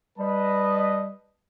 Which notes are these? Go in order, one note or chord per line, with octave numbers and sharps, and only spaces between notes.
G3 B4 D#5 A5